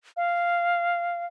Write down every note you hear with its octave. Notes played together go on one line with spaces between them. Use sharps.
F5